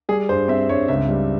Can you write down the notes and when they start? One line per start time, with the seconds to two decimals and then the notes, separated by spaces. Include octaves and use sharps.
0.09 G3 G#4
0.29 G2 C5
0.48 C4 E5
0.69 G2 C#5
0.88 C#2 E5
1.09 G3